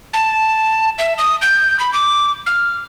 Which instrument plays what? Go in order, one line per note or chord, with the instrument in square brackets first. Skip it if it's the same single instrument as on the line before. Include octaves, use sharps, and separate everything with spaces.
[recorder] A5
E5
D#6
G6
B5
D6
F6